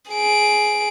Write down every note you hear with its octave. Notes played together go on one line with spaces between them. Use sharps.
G#4 D7